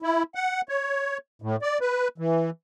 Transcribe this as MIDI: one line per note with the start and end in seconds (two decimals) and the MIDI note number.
0.02 0.23 64
0.35 0.61 78
0.69 1.18 73
1.42 1.56 45
1.62 1.78 74
1.81 2.08 71
2.18 2.50 52